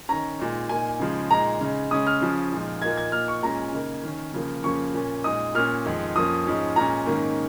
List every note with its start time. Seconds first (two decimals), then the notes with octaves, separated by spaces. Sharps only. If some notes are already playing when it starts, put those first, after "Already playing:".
0.09 D#3 C#4 A#5
0.39 A#2 G#3 D#4
0.69 A#2 A#3 D#4 G#5
1.00 C#3 F3 G#3 D#4
1.30 A#2 G#3 D#4 A#5
1.61 C#3 G#3 D#4
1.91 C#3 G#3 C#4 D#6
2.07 F6
2.21 C#3 F3 C#4
2.52 A#2 F3 G#3 D#4
2.82 A#2 A#3 D#4 G#6
2.97 G#6
3.12 A#2 A#3 D#4 F6
3.28 C#6
3.43 A#2 G#3 C#4 A#5
3.72 C#3 A#3 D#4
4.03 D#3 C#4
4.34 C#3 F3 A#3
4.64 F2 C#3 F3 A#3 C#4 C#6
4.94 A#2 A#3 C#4
5.24 A#2 G#3 D#4 D#6
5.55 A#2 A#3 C#4 F6
5.86 F2 D#3 G#3 D#4
6.15 F2 F3 A#3 C#4 D#6
6.46 G#2 F3 G#3 C#4
6.76 A#2 G#3 C#4 A#5
7.06 G#2 D#3 A#3 C#4